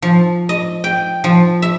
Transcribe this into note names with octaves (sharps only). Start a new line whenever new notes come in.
F3
D#5
G5
F3
E5